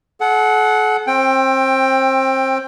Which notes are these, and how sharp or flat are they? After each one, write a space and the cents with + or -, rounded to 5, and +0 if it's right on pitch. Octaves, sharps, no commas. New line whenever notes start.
A4 -40 F#5 +0
C4 +30 G5 +10